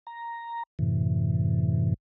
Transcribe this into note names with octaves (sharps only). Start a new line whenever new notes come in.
A#5
F#2 A2 C3 E3